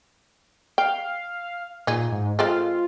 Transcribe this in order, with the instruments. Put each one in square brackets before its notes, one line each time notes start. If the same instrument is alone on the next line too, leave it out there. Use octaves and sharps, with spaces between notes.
[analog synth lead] F5 [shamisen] G5
[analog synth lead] A#2 [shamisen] D#4 G#4
[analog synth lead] G#2
[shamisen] G#3 C4 A4 [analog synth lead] F4